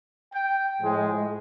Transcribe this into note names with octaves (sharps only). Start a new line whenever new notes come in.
G5
A2 F3 G#3